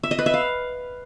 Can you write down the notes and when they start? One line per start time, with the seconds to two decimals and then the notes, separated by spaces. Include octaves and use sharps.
0.03 E5
0.11 D#5
0.19 B4
0.26 E5
0.34 F5